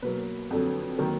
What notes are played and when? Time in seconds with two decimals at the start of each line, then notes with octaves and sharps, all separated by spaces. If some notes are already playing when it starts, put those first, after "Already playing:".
0.02 B2 F#3 A#3 B4
0.51 F2 D3 F#3
0.98 D#3 F#3 A#3